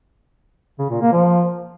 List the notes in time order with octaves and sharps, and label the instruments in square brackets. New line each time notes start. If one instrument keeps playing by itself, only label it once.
[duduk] C#3
A#2
A#3
F3